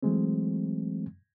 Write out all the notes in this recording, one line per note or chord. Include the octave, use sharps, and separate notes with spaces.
E3 F#3 G#3 A3 C4